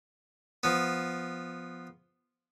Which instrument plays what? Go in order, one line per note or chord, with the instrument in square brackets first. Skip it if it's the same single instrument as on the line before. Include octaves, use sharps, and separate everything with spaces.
[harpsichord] F3 B3